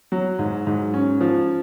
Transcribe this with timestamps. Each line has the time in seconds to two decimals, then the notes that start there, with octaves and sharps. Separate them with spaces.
0.12 F#3
0.39 G#2
0.67 G#2
0.94 C#4
1.21 F3